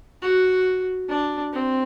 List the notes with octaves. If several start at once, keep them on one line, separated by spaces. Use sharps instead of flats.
F#4
D4
C4